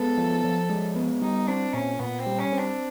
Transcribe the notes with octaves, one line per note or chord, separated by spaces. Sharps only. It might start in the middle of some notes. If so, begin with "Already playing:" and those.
Already playing: G#3 B3 A4
F3
F3
G#3
B3
G3 D#4
C4 D4
A#2 C#4
A#2 B3
C4
G3
C#4
C4
D4